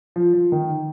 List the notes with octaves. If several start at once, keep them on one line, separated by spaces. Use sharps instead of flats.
F3
F3
D#3